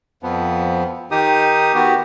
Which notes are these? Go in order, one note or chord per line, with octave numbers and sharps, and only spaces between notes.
F2 F3 B3
D#3 D#4 G4 D#6
D#3 B3 F#4 G4